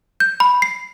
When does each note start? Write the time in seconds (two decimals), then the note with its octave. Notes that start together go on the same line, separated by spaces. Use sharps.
0.20 G6
0.40 B5
0.62 C7